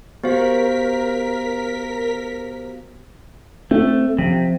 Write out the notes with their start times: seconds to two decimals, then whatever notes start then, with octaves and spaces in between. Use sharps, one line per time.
0.24 B3 F#4 G4 A#4 C5 F5 B6
3.71 A3 C4
4.19 C3 F3